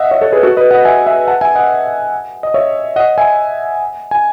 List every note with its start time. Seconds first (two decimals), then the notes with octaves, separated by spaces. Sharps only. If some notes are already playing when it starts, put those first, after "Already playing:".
Already playing: D#5 E5 F#5
0.11 C#5 E5
0.21 A4 C#5
0.32 G#4 B4
0.43 F#4 A4
0.57 B4 D#5
0.71 D#5 F#5
0.85 E5 G#5
1.07 E5 G#5
1.28 F#5 A5
1.41 E5 G#5
1.55 D#5 F#5
2.43 D#5
2.54 C#5 E5
2.96 D#5 F#5
3.18 E5 G#5
4.11 G#5